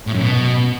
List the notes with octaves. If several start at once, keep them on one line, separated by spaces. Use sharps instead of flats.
A2
F#2
B2